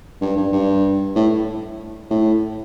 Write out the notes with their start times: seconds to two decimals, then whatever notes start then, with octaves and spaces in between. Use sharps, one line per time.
0.21 G2
0.37 G2
0.53 G2
1.16 A2
2.10 A2